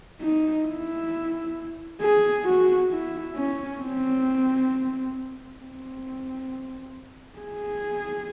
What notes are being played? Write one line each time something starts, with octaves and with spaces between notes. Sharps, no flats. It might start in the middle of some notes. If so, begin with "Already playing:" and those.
D#4
E4
G#4
F#4
E4
C#4
C4
C4
G#4